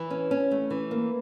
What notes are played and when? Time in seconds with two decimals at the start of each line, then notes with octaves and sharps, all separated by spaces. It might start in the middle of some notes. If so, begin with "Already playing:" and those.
Already playing: E3
0.10 C#4
0.31 C#4
0.51 A3
0.70 E3
0.91 A#3